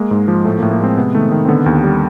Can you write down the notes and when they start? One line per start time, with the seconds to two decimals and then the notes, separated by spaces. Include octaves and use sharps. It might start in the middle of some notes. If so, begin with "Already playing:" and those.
Already playing: G#3 A#3
0.11 G#2
0.28 F3
0.45 A2 A3
0.59 A#3
0.62 A2
0.71 A#3
0.80 G#3 C4
0.97 C3 B3
1.15 D#3 A3
1.32 D#3
1.45 C4
1.48 D3 B3
1.66 D#2
1.84 G3